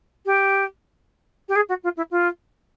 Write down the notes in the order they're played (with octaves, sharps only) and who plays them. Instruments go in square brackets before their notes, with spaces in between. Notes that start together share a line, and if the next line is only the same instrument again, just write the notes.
[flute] G4
G4
G#4
F#4
F4
E4
F4